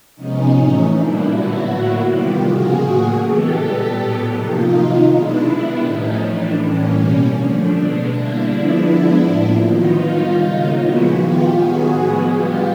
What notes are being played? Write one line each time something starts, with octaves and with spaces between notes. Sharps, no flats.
C3 F3 G#3 B3 C#4 D#4
A2 E3 A3
A#2 G3 A#3 D4 E4
D3 F#3 B3 E4 F#4
A2 F#3 A#3
C3 D#3 G3 B3 F4 G4
C#3 F3 A#3 F#4 G#4
A2 F#3 A#3
C#3 E3 G#3 B3 G4 A4
A#2 G3 B3
A2 F#3 B3
C3 F3 A#3 D#4 F4
C3 D#3 F#3
B2 G#3 B3 D4 E4
D#3 G3 B3
A2 F3 A3 C#4 D#4
A2 E3 A3 D4
A2 E3 G3 A#3 C#4
B2 G3 A#3
D3 F3 A3 D4
B2 G#3 B3
D3 G3 A#3 D4 E4
D3 F3 G#3 B3
D3 F3 G#3 B3
A2 F3 A#3
D#3 F#3 B3 D#4 F4
D#3 G3 B3
C#3 F#3 A#3 D#4 F4
A#2 F3 G#3 B3 E4 F#4
D#3 G#3 B3 F4 G4
D#3 F#3 B3 F#4 G#4
A2 F3 G#3 B3
D3 G3 B3 F4 G4